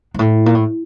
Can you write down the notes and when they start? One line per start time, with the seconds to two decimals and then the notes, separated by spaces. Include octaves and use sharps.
0.14 G#2
0.19 A2
0.46 A#2
0.55 A2